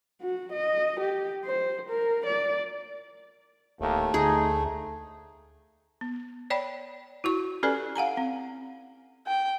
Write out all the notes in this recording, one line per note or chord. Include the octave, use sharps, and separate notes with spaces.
F#4
D#5
G4
C5
A#4
D5
D1 D#2 A3
D2 D#4 G#4
B3
C#5 D5 G5 B5
E4 F#4 C#6
C#4 G4 A4 B4 D5 G#5
F5 F#5 G#5 A#5
C4
G5